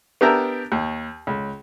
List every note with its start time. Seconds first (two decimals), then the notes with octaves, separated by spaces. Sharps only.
0.21 B3 D4 G4 A#4 E5 A#5
0.72 D#2
1.27 C#2